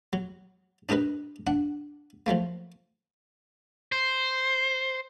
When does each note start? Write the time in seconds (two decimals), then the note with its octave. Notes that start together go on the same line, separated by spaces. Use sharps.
0.13 F#3
0.89 D4 D#4 G4 A#4 B4
1.47 D4 F#5
2.26 F3 F#3 A3 A#3
3.92 C5